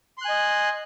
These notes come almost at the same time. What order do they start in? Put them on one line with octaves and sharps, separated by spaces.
C6 F#6 G#5 D#5